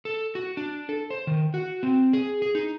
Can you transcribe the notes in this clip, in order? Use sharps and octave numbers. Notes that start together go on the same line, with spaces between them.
A4
F#4
D4
A4
C5
D#3
F#4
C4
G#4
G#4
D#4